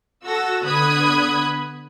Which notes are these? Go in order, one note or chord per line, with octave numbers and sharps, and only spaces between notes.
F#4 A4 E6 A#6
D3 B3 B5 D#6 F#6 G#6